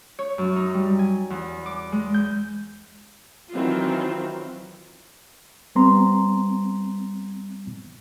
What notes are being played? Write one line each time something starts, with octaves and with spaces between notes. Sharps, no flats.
C#5
F#2
D#4
G3
G#5
E2
D6
G#3
G6
D#3 E3 F#3 C4 F4
G3 B3 C4 A#5 C6